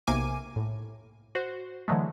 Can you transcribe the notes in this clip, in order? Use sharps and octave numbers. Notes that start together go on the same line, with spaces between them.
B1 C3 A#3 G#5 D6 D#7
A2
F#4 C5
D3 E3 F#3 G#3 A3